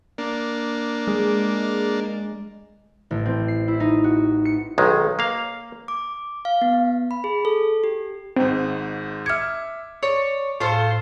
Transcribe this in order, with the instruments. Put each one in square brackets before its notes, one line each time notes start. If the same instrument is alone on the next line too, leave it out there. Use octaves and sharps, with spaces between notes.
[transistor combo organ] A#3 D4
[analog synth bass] G#3
[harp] A1
C4
C7
E4
D#4
F#4
C#7
[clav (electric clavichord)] B1 D#3 G#3
A#3 F5
[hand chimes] D6
F5
B3
B5
G#4
A4
G4
[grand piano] G#1 G#2 [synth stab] C4
[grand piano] E5 D6 C#7 [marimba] F6 G#6
[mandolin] C#5 [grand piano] D5
[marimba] A2 [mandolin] F4 C5 [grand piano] A4 F5 A5